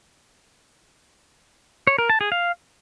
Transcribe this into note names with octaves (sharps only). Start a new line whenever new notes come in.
C#5
A#4
A5
G#4
F5